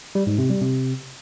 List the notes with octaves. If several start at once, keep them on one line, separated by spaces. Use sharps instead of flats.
G3
G#2
C3
G3
C3